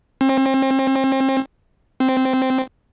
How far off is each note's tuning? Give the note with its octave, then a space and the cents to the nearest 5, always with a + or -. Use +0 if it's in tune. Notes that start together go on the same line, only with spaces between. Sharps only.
C4 +35
C4 -5